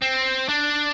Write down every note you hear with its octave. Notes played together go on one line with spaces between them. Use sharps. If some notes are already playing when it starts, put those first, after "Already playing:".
C4
D4